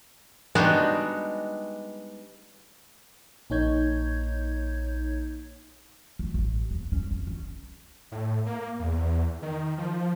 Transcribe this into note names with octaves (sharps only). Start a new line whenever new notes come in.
G3 G#3 B3 D4 D#4 F#4
A#1 A#3 D#4 C#5 G6 G#6
A3
A1
B3
C#4
F2
C#4
A2
A#3
E2
D#3
F3